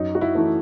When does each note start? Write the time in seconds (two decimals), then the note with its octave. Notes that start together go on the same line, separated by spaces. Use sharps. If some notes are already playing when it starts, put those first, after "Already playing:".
Already playing: F#2 D#4
0.15 F#4
0.21 E4
0.35 E3 A3